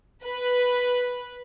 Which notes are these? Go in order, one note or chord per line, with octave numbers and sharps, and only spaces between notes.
B4